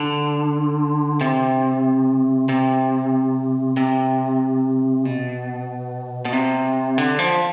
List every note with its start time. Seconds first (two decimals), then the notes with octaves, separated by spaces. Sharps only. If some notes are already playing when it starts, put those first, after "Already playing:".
Already playing: D3
1.21 C3
2.49 C3
3.77 C3
5.05 B2
6.25 B2
6.33 C3
6.98 D3
7.19 F3